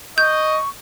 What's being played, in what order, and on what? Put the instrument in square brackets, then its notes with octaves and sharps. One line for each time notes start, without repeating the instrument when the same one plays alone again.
[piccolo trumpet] D#5 [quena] C#6 [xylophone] G6